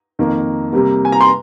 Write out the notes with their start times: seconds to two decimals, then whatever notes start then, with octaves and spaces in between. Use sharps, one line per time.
0.19 F2 D#3 A#3
0.73 C3 G3 A#3
1.05 G#5
1.12 A#5
1.21 C6